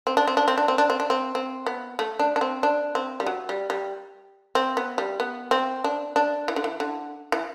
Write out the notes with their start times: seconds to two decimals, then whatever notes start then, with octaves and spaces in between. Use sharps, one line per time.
0.07 C4
0.17 D4
0.27 C4
0.37 D4
0.48 C4
0.58 D4
0.68 C4
0.78 D4
0.90 C4
1.00 D4
1.10 C4
1.35 C4
1.67 B3
1.99 A3
2.19 D4
2.36 D4
2.41 C4
2.63 D4
2.95 C4
3.20 G3
3.26 F#3
3.49 G3
3.70 G3
4.55 C4
4.77 B3
4.98 G3
5.20 B3
5.51 C4
5.84 D4
6.16 D4
6.48 E3
6.56 D3
6.64 E3
6.80 D3
7.32 E3